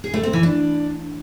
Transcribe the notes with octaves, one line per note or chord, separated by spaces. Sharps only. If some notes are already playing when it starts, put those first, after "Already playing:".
G#4
A3
C4
E3
D4